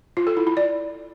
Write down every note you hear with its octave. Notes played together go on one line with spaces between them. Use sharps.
F4
A4
E4
E4
D5